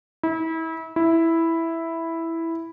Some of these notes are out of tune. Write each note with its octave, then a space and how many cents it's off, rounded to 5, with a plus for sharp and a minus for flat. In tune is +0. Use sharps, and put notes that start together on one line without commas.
E4 -30
E4 +0